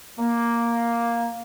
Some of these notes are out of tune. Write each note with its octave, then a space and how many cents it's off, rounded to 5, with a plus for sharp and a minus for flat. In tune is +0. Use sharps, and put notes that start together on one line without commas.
A#3 +5